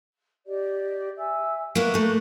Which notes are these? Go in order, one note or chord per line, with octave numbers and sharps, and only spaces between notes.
G4 D5 D#5
E5 G#5 E6
A#3 B3 E4 A#5 C#6 F#6
A3 A#3